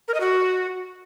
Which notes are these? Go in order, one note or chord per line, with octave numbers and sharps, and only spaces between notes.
A#4
D#5
F#4